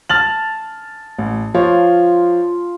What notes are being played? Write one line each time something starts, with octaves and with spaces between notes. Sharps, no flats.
A5 F6 A6 F#7
A1
F3 F4 C#5